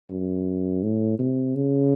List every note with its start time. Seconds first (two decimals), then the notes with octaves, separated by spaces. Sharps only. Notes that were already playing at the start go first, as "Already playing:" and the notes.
0.10 F#2
0.83 A2
1.19 C3
1.55 C#3